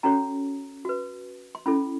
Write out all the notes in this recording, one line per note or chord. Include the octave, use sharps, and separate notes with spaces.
C#4 F#4 A4 C#5 A#5
F#4 B4
C6
C#4 E4 A4 B5